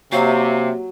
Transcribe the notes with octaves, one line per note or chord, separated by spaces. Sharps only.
C3 F#3 A#3 G4 E5 F5